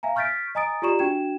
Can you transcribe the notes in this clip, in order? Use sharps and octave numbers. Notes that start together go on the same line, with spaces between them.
E5 F5 G#5 A#5
C#6 F6 G6 A6 B6 D7
D#5 G#5 A#5 D#6 A6 D7
F4 G4 D5 A#5 C#6 E7
D4 F#4 G5 G#6 E7